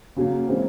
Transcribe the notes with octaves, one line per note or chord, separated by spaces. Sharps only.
C#3 F#3 A#3
E3 G#3 C4